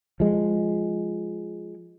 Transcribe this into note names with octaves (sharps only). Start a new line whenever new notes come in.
F3 G#3